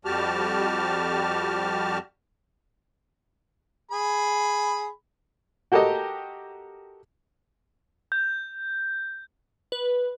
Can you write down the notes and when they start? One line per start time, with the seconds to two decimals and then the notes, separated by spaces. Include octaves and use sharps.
0.05 F2 G3 F#4 G4 A5 F6
3.92 G#4 B5
5.72 F#4 G4 A4 A#4 D#5 G5
8.12 G6
9.72 B4